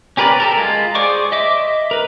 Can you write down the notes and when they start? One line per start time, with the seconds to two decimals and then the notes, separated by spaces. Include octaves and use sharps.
0.17 C#4 G4 A#4 B4 D5
0.40 G4 A4 A#4
0.58 G#3 F4
0.95 G#4 C5 D5 C#6 D6
1.32 D#5 E5 D6
1.91 A#4 B4